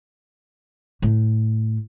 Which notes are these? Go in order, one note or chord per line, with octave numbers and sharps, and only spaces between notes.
A2 A3